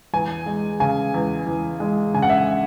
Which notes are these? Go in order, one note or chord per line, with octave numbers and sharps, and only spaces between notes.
E2 G#5
G#3
C#3 G#5
E2
E2
G#3
C#3 G#5
F#5
E5
F#5